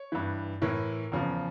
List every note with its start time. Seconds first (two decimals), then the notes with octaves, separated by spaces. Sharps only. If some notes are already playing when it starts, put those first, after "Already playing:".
Already playing: C#5
0.12 G2 E3
0.62 A2 E3 A#4
1.12 E2 C#3 F3